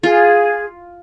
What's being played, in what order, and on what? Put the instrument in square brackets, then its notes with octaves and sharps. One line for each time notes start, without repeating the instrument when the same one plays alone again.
[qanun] F4 [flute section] G#4